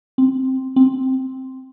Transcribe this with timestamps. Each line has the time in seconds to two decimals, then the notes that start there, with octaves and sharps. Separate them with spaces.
0.18 C4
0.76 C4